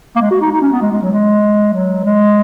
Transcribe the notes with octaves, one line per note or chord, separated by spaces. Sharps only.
A#3
G#3
F#4
D#4
D#4
C#4
B3
G#3
G#3
F#3
G#3
F#3
G#3